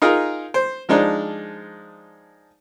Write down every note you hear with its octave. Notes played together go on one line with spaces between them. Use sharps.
D#4 F4 G#4 A#4
C5
F3 G#3 D4 D#4